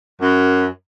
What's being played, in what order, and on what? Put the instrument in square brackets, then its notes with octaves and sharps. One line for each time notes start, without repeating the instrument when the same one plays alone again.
[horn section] F#2